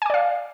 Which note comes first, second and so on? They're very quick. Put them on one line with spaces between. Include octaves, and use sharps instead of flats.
G#5 D6 D5 F5